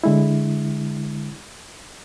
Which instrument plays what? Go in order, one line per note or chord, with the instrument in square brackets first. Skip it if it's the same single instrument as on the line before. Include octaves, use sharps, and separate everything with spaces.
[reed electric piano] D3 G#3 E4